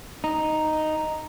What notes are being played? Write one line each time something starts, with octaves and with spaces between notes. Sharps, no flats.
D#4